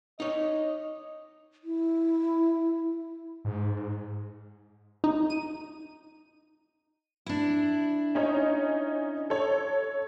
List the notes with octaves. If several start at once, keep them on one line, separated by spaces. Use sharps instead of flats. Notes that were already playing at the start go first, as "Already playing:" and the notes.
D#4 C#5 D#5
E4
G#2
D#4
D#7
D4 E4
C#4 D#4 C#5
A4 C#5